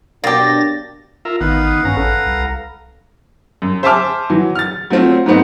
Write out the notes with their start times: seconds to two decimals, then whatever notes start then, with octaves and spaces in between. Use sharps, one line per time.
0.24 B2 F#3 A#3 D4 G4 A6 A#6
1.25 F4 A#4 E5
1.41 A1 D#3 B3 B4 F5 F#5
1.66 D#6
1.85 G2 C#4 A#5
1.97 A1 A4
2.26 C2
3.62 F#2
3.83 C5 E5 G#5 A5 D6 F6
4.30 E3 F#3
4.55 F6 A6
4.90 F#3 A3 C4 F4
5.26 G#2 F#3 A3 B3 C4 D#4